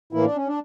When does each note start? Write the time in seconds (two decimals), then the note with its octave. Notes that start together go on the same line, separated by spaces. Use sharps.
0.13 A2 E3 A#3 E4
0.25 D4
0.36 C#4
0.47 D4